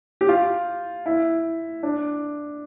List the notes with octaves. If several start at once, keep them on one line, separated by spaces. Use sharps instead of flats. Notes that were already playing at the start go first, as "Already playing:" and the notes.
G4
F4
E4
D4